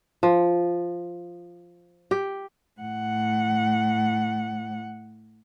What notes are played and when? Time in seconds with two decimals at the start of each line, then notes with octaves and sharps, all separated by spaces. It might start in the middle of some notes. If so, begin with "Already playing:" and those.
0.23 F3
2.11 G4
2.81 A2 F#5